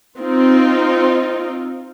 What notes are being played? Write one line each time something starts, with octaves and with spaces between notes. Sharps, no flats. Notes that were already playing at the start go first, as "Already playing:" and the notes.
C4 D#4 F4